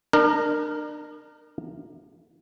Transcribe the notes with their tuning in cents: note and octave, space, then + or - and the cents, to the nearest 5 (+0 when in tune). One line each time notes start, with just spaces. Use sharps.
D4 +40 A#4 +0